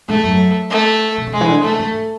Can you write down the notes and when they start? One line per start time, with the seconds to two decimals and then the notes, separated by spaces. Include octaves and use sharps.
0.08 G#2 A3
0.24 F#2
0.71 A3
1.17 B2
1.27 C#3
1.33 B2 G#3
1.41 E3
1.49 D3
1.64 C#3 A3
1.79 G#2